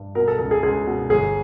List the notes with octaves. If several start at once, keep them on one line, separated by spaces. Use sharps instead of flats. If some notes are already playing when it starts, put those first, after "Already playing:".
Already playing: G2
B2 A#4
A4
C#2 A4
G#4
C#2 G#4
B2
G1 G#4